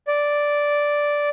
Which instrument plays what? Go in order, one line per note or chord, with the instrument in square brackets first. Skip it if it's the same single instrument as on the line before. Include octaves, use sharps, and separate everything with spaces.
[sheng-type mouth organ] D5